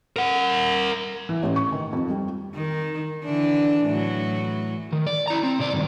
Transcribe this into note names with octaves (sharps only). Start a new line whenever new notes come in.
A#4 F#5
E3
A1
C#6
D#3
F2
G3
D#3
D3 E3 D4
A2 E3 F#3
D#3
D5
E4 A#5
C4
C3 D5
G2 D#3